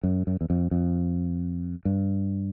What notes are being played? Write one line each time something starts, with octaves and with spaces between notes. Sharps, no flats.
F#2
F#2
E2
F2
F2
G2